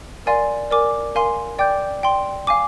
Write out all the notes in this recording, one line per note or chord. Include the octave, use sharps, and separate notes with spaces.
A#4 D5 F5 G#5 C6
A#4 D5 G#5 D6
A#4 F5 G#5 C6
D5 G5 D6 G6
D5 G5 C6
F5 G#5 D6